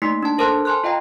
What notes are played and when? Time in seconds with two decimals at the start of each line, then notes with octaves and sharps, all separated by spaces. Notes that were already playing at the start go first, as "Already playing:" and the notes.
0.02 A3 A#3 D#4 C6 B6 C7
0.23 D4 A5
0.38 A4 A#4 C5 A5 C6 F#6
0.65 G#5 A5 C6 F6 F#6
0.84 F4 D#5 F5 G5 A#5